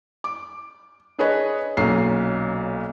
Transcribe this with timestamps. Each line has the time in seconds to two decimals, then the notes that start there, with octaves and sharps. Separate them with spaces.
0.24 D6
1.18 D4 G#4 B4 C#5 D#5
1.77 B1 A#2 F#3 C#4 A#5 C7